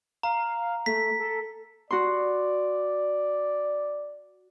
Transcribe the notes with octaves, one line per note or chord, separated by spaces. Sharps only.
F5 A#5
A3 B6
A4
F#4 D5 C6